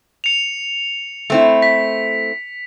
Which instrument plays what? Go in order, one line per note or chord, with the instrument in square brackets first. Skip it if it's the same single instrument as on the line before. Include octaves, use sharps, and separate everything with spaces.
[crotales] C#7 F7
[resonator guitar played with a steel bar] A3 C4 E4
[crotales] B6